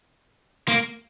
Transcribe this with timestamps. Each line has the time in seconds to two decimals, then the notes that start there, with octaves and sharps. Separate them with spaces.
0.68 A#3